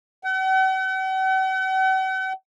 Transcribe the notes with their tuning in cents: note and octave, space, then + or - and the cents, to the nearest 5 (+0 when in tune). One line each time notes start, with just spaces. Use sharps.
F#5 +45